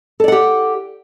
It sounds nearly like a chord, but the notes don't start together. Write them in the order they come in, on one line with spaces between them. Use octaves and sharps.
A4 D5 F#5 G4